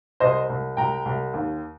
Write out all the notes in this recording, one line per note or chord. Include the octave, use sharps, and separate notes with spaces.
C2 C5 D#5
C2
C2 G5 A#5
C2
D#2